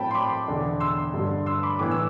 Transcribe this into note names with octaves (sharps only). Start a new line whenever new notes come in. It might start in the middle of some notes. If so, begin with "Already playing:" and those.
Already playing: A2 F#3 C4 G5 A5 B5
C6
B5 D6
E1 E2 D3
C6 E6
G2 D3 G3
C6 E6
B5 D6
A2 E3 B3 E4 D6
E6